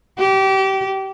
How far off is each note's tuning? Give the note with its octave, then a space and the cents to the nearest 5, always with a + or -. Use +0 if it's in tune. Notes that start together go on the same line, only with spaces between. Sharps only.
G4 -25